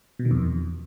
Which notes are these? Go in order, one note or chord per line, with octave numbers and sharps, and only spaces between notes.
B2
D#3
F2
E2